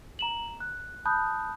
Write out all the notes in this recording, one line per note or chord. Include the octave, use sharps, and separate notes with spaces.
A#5 E7 F#7
F#6
A5 B5 D#6 F#6 G6